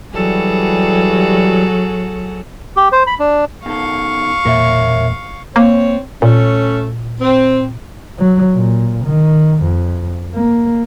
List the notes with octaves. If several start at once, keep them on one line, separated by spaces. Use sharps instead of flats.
E3 F#3 G3 F#4 G#4 A4
G4
C5
B5
D4
B2 D#3 A4 F5 C#6
E1 A#2 A#3 A#4 C#5 E5
A#3 C4 C#5
A#2 A3 C#4
C4
F#3
A#2
D#3
F2
A#3